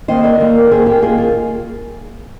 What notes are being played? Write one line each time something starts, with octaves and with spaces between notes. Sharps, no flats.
D#3 A#3 C5 D#5
A#4 D5
D#3 A#3
A#4
D#3 A#3 G#4 C5
G4 A#4
D#3 A#3 F4 G#4
F4 G#4